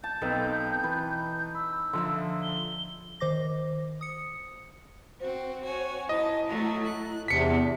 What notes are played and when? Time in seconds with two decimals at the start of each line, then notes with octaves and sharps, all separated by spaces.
0.04 A5 G6
0.21 B1 C4 D#4 A4 B4
0.84 E3 B4
1.55 B5 E6
1.93 D3 F3 E5 A#5 C6
2.43 G7
3.20 D#3 C5 D6 A#6
4.01 D#6 C#7
5.20 C4 F#4 C5
5.64 F#4 C5 C#5 G#5
6.09 G#2 E4 D#5 A5 B5
6.47 F#3 A3
6.85 F#6
7.28 E2 C3 D4 B6 C#7